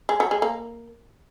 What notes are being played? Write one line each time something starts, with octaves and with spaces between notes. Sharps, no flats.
G#3
F#3
G#3
A#3